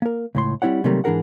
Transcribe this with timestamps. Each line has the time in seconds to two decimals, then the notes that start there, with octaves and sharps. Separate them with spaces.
0.02 A#3 A#4
0.35 C#2 A2 C6
0.62 G3 C4 E4 C#5 F#5
0.84 C3 D#3 F#3 G3 A3 A#3
1.04 G#2 E3 D4 G#4 A#4 F#5